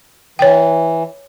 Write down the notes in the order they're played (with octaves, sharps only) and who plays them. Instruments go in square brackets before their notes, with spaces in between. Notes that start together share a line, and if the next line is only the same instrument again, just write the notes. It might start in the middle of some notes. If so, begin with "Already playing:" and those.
[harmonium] E3 [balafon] C#5 G5